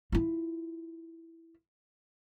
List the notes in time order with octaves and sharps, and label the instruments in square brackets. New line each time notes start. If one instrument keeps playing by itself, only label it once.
[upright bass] E4 F4